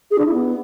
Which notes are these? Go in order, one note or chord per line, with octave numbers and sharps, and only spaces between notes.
G#4
D4
E4
B3